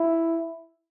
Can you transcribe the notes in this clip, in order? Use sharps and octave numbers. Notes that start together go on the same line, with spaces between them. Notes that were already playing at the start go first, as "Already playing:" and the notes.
Already playing: E4